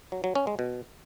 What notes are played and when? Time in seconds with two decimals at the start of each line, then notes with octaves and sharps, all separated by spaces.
0.12 F#3
0.24 F#3
0.35 C#4
0.47 G#3
0.59 B2